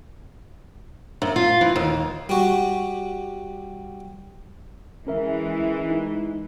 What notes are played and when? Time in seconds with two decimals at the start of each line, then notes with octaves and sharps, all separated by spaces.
1.22 F#2
1.36 F4
1.61 E3
1.76 D#2
2.29 G3 F#4
5.07 E3 G#3 C#4 A#4 E5
5.90 D#4